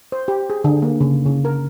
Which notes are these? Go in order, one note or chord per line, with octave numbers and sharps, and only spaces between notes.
C5
G4
G#4
D3
A#3
C#3
C#3
A#4